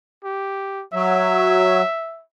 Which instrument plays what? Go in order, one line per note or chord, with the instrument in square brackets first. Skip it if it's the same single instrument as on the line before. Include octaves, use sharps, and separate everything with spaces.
[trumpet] G4
[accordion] F#3 [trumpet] E5